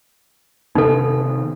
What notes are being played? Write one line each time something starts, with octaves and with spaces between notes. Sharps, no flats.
C3 D#3 B3 D#4 A4